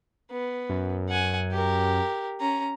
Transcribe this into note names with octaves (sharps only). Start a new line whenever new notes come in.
B3
F#2
F#5 G#5
G4 A#4
C#4 A#5